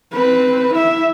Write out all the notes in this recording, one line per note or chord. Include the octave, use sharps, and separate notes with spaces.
C4 B4
E4 E5